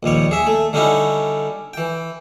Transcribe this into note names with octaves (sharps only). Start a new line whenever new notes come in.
A#1 D#2 G3 C#5
G#4 E5
A3
D3 G3 C#4 D#4 E4 F#4
E3 G5